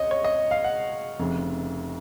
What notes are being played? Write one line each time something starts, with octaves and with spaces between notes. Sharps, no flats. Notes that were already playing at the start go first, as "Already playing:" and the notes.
Already playing: C#2 C#5 D#5
C#5
D#5
F5
F#5
F1 F2 C#3